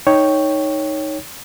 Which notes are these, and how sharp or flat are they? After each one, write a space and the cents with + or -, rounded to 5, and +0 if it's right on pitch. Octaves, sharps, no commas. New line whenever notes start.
D#4 +0 C#5 +0 G5 +0